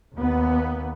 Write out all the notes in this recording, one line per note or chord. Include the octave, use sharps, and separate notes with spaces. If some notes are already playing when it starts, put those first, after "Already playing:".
D#2 B3